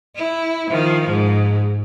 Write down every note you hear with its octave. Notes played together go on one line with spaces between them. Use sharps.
E4
D#3 F3
G#2